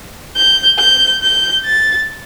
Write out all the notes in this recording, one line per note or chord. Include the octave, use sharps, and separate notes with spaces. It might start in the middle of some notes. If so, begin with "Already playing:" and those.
G6
G6
G6
A6